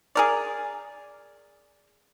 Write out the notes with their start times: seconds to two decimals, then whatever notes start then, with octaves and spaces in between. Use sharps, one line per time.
0.15 G#4 A#4 D5